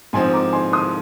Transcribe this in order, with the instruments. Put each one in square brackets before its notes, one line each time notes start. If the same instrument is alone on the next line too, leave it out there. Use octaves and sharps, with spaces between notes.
[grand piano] G#2 F3 C4 D#4 [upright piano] G#5 C6
[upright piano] A#5 D6
G#5 C6
C6 D#6